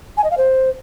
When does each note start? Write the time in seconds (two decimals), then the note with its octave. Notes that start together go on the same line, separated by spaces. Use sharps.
0.17 G#5
0.24 D#5
0.31 F5
0.38 C5